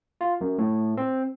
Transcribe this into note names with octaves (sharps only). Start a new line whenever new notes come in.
F4
F#2
A2
C4